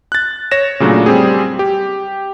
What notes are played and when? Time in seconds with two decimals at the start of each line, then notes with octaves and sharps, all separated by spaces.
0.12 F#6 A6
0.51 C#5 A#6 E7
0.80 A#2 C#3 F#3 A3 D4
1.06 G3 C4 G4 G#4
1.59 G4